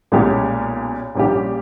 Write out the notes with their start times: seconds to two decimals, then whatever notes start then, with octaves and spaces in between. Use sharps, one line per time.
0.12 B1 A#2 G#3 C#4 G4
1.15 A#1 A#2 G3 C#4 G4